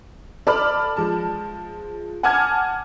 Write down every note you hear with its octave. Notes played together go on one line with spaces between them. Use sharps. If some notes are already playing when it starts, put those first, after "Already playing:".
A4 D5 A5 B5 D6 F6
F3 G#3 A5
F#5 G#5 A5 D6 F6 G#6